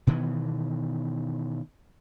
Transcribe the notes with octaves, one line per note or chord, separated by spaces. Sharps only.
B2 D#3 E3 B3